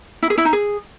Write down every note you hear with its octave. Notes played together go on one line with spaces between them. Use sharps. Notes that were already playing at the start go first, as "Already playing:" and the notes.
E4
G#4
E4
D#4
G#4